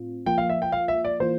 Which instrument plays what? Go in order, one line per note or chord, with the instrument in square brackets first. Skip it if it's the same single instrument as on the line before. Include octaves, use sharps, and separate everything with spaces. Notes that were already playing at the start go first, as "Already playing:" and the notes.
Already playing: [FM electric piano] A2 C4 F4
[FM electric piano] F3 A#3 F4 [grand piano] G5
[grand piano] F5
E5
G5
F5
E5
D5
[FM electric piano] E3 A#3 F4 [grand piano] C5